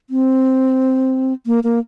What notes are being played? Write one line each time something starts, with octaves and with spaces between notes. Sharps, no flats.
C4
A#3
A#3